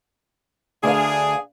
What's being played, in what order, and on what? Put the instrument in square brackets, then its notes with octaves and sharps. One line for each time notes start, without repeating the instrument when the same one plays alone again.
[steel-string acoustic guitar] D2 F5 [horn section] D4 G#4